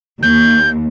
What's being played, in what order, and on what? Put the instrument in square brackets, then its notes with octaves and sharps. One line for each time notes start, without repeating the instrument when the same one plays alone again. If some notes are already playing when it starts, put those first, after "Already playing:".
[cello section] D#2 [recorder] G6